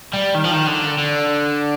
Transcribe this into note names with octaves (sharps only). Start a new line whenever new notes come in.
G3
D#3
F3
D#3
D3
D3